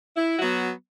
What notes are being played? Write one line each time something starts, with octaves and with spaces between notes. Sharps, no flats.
E4
F#3 B3 F#4